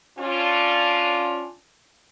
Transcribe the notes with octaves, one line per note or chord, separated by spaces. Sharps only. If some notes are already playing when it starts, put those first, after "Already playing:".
C#4 D4 F4